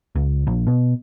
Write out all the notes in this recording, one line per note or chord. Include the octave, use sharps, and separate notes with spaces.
C#2
A#1
B2